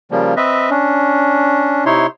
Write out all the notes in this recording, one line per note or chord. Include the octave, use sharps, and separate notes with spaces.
C#3 F3 G3 A#3
C4 B4 D#5 E5
C#4 D4
C3 D#4 E4 C#5 C6